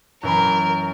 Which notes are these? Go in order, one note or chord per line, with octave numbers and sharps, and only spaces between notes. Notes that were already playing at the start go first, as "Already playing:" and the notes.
F#2 E3 A#4 B5